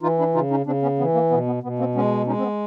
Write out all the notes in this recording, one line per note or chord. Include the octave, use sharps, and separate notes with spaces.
E3 D#4 F4
D4 E4
C#3 D#4 F4
C#4 D#4
C#3 C4 D4
B3 C#4
E3 B3
A#3
B2 B3
B3
B2 B3
A#3 C4
G#3 B3 C#4
G#3 C#4 D#4
C4
B3